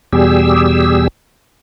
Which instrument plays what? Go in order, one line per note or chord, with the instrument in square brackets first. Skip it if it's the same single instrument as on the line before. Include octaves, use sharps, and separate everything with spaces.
[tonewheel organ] E2 B2 G3 G4 G#4 E6